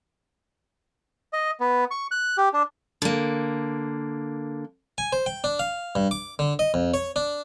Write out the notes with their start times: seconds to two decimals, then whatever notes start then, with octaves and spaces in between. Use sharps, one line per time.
1.33 D#5
1.60 B3
1.91 C#6
2.11 F#6
2.38 G4
2.53 D4
3.02 D3 A#3
4.98 G#5
5.12 C5
5.26 G5
5.44 D4
5.59 F5
5.95 G2
6.11 D6
6.39 D3
6.59 D#5
6.74 F2
6.94 C#5
7.16 D4